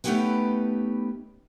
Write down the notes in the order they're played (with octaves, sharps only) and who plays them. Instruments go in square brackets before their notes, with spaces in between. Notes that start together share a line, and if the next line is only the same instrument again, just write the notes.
[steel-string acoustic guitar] A3 B3 C#4 D#4 G4 B4